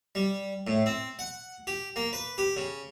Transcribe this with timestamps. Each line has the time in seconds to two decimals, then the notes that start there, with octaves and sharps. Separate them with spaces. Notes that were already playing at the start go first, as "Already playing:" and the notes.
0.15 G3
0.67 A2
0.86 C4
1.19 F#5
1.67 G4
1.96 A#3
2.13 B4
2.38 G4
2.57 C#3